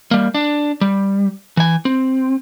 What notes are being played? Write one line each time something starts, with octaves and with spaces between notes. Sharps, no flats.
G3 A#3
D4
G3
E3 G#5
C4